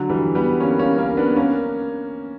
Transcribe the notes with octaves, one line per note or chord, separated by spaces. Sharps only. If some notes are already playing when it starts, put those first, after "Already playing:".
Already playing: D3 F#3
E3 G3
G3 B3
A#3 C#4
A#3 C#4
A#3 C#4
B3 D4
A#3 C#4